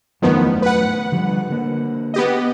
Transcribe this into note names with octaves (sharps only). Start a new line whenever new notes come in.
E1 F#2 A2 D#3 F3 B3
B4 F#5
D3 F3 G3
D3 A#3
B3 G4 D#5